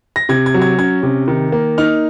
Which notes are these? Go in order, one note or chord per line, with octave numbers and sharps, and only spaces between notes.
A#6
C3 G#6
G#6
F#3
G#6
C#4 G#6
C3
D#3
A#3
D#4 F6